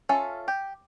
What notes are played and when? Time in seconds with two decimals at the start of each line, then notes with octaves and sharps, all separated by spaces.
0.09 C#4 F4 A4 E5
0.48 G4